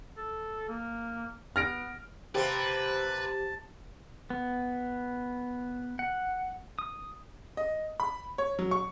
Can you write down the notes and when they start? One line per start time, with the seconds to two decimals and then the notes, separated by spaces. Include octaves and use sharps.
0.17 A4
0.69 A#3
1.56 B3 F6 A#6 D7
2.35 C3 A#3 C4 G4 B4 C5 A5
4.30 B3
5.99 F#5
6.79 D#6
7.57 D#5
8.00 B5
8.38 C#5
8.59 F#3
8.71 C#6